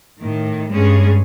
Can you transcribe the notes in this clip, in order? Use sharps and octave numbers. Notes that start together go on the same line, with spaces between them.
A2 D#3
G2 G#3 C#4 G#4